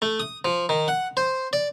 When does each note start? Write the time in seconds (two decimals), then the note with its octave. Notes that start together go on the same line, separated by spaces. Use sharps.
0.02 A3
0.20 D#6
0.45 F3
0.69 D#3
0.88 F#5
1.17 C5
1.53 D5